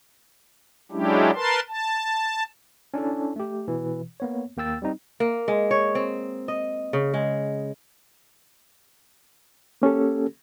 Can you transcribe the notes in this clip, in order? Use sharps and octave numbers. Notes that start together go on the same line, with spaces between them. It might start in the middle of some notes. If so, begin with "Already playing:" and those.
F#3 G#3 C#4 D4 E4 G4
A#4 B4 A5 C6
A5
C#4 D4 E4 A4
A3 G4
B2 E3
A#3 B3 C#5
D#2 A#3 G5 E6 A6
G3 C4 D#4
A#3
G#3
C#5
C4
D#5
C#3
G#3
A#3 C#4 G4 A4